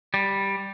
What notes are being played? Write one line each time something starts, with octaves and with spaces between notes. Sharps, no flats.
G3